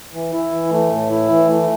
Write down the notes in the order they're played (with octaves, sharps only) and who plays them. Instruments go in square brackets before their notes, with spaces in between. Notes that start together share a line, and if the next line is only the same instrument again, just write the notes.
[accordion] E3
E4
E3
A3
A2
E4
E3
A3